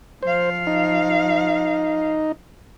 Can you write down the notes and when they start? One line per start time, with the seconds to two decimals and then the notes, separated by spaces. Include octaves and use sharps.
0.23 F3 C5 F5
0.67 D#4